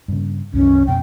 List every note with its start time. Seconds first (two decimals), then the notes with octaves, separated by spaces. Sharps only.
0.08 G2 C#3
0.53 C2 F#2 D#3 C#4
0.87 F2 B2 G5